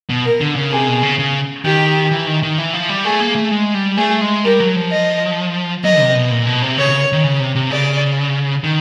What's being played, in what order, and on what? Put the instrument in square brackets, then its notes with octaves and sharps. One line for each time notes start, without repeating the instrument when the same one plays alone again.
[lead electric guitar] B2
[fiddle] A#4
[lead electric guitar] D3
C#3
[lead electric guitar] C3 [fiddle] G#4
[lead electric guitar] B2
C#3
C#3
[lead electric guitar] D#3 [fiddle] G4
[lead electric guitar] E3
D#3
D#3
E3
F3
G3
[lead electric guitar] A3 [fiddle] G#4
[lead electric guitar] A#3
A3
G#3
G3
[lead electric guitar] A3 [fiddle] G#4
[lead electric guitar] G#3
[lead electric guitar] G3 [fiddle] A#4
[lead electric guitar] F#3
F3
[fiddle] D#5
[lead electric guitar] F#3 [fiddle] D#5
[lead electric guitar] C3
B2
A#2
B2
C3
[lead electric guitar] C#3 [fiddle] C#5
[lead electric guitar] C#3
D#3
C#3
C3
C3
[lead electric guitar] C#3 [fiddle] D5
[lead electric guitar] D#3